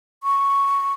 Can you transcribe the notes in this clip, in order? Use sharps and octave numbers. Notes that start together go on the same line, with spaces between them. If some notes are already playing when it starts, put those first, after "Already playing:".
C#6